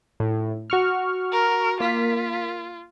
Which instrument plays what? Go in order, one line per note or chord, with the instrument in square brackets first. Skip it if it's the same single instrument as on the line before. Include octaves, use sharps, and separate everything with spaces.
[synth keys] A2
F#4 C#6 F6
[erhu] A#4
[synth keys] A#3 B6 [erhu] F4